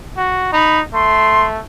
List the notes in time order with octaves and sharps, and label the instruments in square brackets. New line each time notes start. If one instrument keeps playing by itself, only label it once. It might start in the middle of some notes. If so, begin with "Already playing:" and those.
[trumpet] F#4
[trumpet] D#4 [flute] B5
[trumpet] A3 [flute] C6